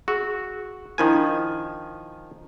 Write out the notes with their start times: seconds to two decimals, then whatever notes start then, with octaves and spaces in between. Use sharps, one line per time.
0.08 F#4 G#4
0.98 D#3 F3 D4 E4 A#4 G#5